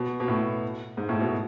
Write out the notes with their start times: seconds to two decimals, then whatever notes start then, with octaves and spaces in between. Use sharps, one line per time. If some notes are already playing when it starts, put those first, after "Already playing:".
Already playing: B2
0.20 B2
0.28 A2
0.97 G#2
1.09 A2
1.21 B2